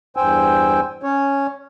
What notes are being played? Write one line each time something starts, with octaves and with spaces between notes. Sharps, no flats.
E2 G2 C5 G5 G#5 E6
C#4 C#5